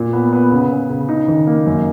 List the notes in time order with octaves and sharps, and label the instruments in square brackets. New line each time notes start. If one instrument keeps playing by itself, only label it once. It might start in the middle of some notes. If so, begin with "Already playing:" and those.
Already playing: [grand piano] A#2
B3
B3
C#3
C#3
C#3
D#4
D#3
A#3
F#2